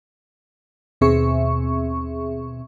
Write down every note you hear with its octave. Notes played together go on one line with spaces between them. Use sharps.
D#2 B2 C4 G#4 E5 C#6